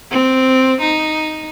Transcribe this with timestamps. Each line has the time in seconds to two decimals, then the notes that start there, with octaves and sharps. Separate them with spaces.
0.11 C4
0.81 D#4